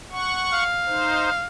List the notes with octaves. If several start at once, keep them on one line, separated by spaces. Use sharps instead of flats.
F#5 C#6
F5
D#4 C5